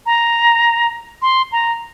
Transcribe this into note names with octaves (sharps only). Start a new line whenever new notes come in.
A#5
C6
A#5